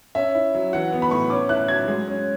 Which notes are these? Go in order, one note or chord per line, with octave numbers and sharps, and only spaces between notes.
C#4 E5
E4
F#3
E3 F#5
B3
B5
A2 C#6
C#4 D6
E4 F#6
F#3 G#6
G#3
C#4